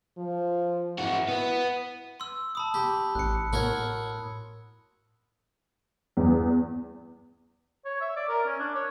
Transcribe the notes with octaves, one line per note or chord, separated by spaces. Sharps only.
F3
G#2 E4 F#4
B3
C6 E6
A5 B5 D#6
G4
A1 F#6 C#7
A2 F#4 A#4 C#5
E2
C#5
E5
D5
A#4
C#4
D4
C#5